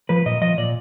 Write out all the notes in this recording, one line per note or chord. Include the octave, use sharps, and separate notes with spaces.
F3 B4
A#2 D#5
F3 D#5
A#2 D5